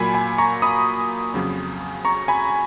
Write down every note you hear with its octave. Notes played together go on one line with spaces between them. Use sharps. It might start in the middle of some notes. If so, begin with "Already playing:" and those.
Already playing: A#2 F#3 A#3 G#5 B5
G#5 B5
A#5 C#6
B5 D#6
F2 C#3 F#3 C#4
A#5 C#6
G#5 B5